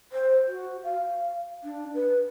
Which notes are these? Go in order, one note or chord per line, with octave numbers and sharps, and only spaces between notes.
C5
F#4
F5
D4
B4